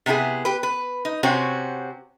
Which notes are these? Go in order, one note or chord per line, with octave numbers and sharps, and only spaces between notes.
C3 B3 D4 E4 G#4
G4 B4
B4
D#4
C3 C4 C#4 F#4